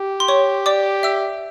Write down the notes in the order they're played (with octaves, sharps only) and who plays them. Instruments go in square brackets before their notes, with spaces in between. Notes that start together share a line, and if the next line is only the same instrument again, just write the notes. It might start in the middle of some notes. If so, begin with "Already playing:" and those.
Already playing: [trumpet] G4
[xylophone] C6
C#5 C#6
D5 D6
E5 E6